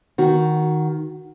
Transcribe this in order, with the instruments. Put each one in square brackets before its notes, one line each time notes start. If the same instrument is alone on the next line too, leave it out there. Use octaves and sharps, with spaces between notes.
[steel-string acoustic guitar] D#3 F#4